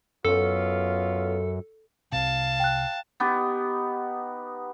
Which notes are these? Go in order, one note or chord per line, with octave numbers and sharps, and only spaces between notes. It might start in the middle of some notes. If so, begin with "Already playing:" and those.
F#2 B3 C#4 F4 A4
C2 C3 F5 A5
G5 F#6
B3 D#4 G4